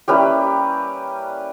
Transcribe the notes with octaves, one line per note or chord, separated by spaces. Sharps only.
G3 A#3 C#4 E4 G4 B4